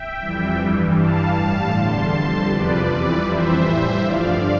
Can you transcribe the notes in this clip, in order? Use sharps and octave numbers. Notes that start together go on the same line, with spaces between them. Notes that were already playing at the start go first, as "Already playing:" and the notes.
Already playing: E5 G5
F2 E3 G3
G2 E3 G3
G2 E3 G3 F5 A5
A2 G3
E2 D3 G3 A5 C6
F2 D3 G3
E2 C3 F3 B4 D5
F2 E3 G3
F2 E3 G3 C5 E5
A2 E3 G3
G2 D3 F3 D5 F5